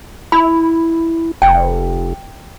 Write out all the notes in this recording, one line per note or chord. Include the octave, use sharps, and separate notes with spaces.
E4 B5
F1 G5